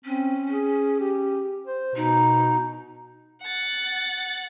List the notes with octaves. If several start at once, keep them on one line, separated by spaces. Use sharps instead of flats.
C4 C#4
G#4
G4
C5
B2 D#4
F#5 A6